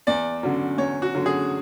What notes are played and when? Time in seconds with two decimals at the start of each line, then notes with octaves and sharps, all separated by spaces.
0.07 E2 D5
0.43 D3 F#3 C#4
0.78 E2 C#5
1.02 F#4
1.15 D3 F#3 C#4
1.26 G#4